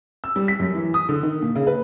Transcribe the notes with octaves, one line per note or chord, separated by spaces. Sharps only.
E6
G3
B6
F#2
E3
D#6
D3
D#3
A#2
C#3
B4